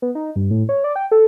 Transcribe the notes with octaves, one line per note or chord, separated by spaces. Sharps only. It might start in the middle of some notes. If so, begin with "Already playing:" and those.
B3
D#4
G2
A2
C#5
D5
G5
A4